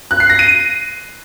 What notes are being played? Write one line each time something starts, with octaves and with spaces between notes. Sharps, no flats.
F#6
C7
A#6
D#7